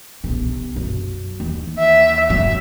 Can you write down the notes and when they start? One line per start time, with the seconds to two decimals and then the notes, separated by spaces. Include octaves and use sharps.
0.24 B1 C3
0.76 F#2
1.40 D#2 E3
1.79 E5
2.30 F#2 F#3 E5